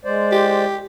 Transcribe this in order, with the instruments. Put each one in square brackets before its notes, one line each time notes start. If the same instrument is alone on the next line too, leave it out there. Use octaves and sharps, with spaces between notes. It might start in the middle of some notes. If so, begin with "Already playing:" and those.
[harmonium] G#3 C5 D5
[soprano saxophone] G4